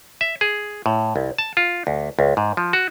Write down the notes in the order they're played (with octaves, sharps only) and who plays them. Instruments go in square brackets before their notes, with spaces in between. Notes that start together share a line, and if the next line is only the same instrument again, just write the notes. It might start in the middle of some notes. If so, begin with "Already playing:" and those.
[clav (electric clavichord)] E5
G#4
A2
C2
A5
F4
D2
C#2
G#2
F3
F#4